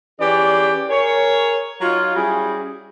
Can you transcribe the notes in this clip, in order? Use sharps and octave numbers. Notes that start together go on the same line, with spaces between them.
E3 C#4 G4 G#4 D5
G#4 A#4 C#5
F#3 D#4 F4
G3 C#4 E4 F#4 G#4